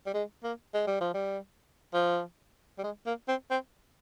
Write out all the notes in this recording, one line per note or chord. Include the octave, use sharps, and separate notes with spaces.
G3
G#3
A#3
G#3
G3
F3
G3
F3
G3
G#3
A#3
C4
C4